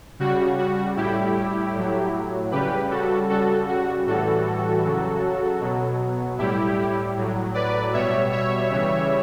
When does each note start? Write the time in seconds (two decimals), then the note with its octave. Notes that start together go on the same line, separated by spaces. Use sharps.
0.19 C#3 G3 F#4
0.59 F#4
0.97 A2 G3 E4 G4
1.74 A2 F#3
2.51 C#3 G3 G4 B4
2.91 F#4 A4
3.29 C#3 G3 F#4 A4
3.68 F#4
4.06 A2 E3 G3 F#4 A4
4.85 C#3 F#3
5.61 B2 F#3
6.38 A2 G3 E4 G4
7.16 A2 F#3
7.54 B4 D5
7.93 B2 G3 C#5 E5
8.32 C#5 E5
8.71 C#3 E3 G3